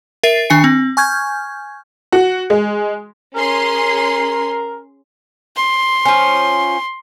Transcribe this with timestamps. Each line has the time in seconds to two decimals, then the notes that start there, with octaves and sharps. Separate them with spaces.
0.23 A#4 E5 A6 C7 D#7
0.50 D#3 D4 G#5 C#7
0.64 C4
0.97 G#5 C#6 F6 G6 G#6
2.12 F#4
2.50 G#3
3.35 C#4 G#4 A#4 C6
5.56 C6
6.05 F3 C#4